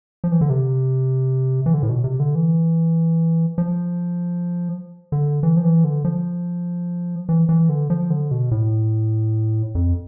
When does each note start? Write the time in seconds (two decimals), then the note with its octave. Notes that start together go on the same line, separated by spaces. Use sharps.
0.24 F3
0.32 E3
0.41 D3
0.50 C3
1.66 E3
1.74 D3
1.83 A2
1.89 B2
2.04 C3
2.20 D3
2.35 E3
3.58 F3
5.12 D3
5.43 E3
5.57 F3
5.64 E3
5.84 D3
6.05 F3
7.29 E3
7.49 E3
7.69 D3
7.90 F3
8.10 D3
8.31 B2
8.51 A2
9.75 F2